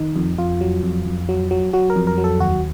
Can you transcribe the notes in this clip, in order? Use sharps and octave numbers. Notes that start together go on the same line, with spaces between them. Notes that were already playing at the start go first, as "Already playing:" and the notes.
Already playing: D#3 D#4
F2
F2 F4
F#3
F2
F2
F#3
F#3
F#3 F#4
A#4
F2
A#4
F#3
A4
D#2 F#4